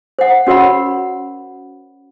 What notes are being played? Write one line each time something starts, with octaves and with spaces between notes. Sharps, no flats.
C5 F#5
C#4 F#4 A#4 C#5 F#5 B5